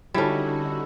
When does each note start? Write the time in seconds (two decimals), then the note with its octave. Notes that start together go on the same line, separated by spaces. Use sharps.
0.14 D3 G3 C#4 D#4 E4 F#4 A4